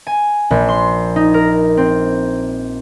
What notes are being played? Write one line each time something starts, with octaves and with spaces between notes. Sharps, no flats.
G#5
A#1
C6
D#4
A#4
C4